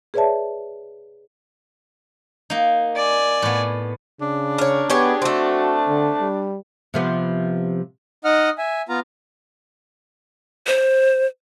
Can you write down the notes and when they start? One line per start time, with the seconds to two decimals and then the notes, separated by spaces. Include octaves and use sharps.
0.14 G#4 B4 C#5 D5 E5 A5
2.50 A#3 D#4
2.96 D5 G#5
3.42 A2 B3
4.21 C#3 D4
4.58 A#4 C#5
4.90 B3 G4 G#4 C#5
5.22 A3 C4 F#4
5.88 D3
6.21 G3
6.94 C3 F3 B3
8.25 D#4 D#5 F#5 F6
8.58 E5 G#5
8.89 B3 F4 F5 A#5
10.67 C5